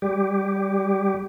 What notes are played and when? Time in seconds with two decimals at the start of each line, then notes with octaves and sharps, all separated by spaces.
0.02 G3 G4